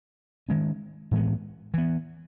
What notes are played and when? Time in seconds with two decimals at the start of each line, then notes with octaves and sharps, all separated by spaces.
0.49 D#3 G#3 C#4
1.11 A2 E3 G#3 B3
1.74 E3 B3